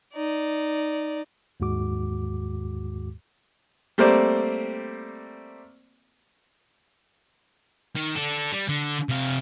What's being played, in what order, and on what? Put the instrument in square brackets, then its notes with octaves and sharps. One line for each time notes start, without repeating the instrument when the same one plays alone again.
[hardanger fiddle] D#4 D5
[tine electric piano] D#2 G#2 D#3 G#3 F#4 D6
[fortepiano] G3 A3 A#3 C4 C5 D5
[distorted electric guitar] D#3
D4 A4
G3
D3
C3 F5